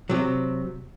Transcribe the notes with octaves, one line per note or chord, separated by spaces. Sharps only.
C3 F#3